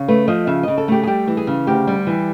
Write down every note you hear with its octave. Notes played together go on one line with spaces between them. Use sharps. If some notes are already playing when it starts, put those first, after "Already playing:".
Already playing: C#3
A3 B4
F3 D#5
C#3 E5
C#3 D#5
A4
A3 G4
G#4
G3 G4
E3
G#4
C#3
D2 G4
G3
E3